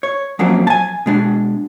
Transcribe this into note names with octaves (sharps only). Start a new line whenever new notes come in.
C#5
F3 F#3 A#3 C4 C#4
G#5 A5
B2 G#3 D4